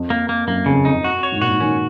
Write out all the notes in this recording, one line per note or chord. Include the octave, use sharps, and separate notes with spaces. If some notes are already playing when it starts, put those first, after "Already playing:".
Already playing: F2
A#3
A#3
F#2 A#3
F2 C#3
F2 D#4
F#4
C#5
G#2
A#2 F#4
G#2
D#3 C#4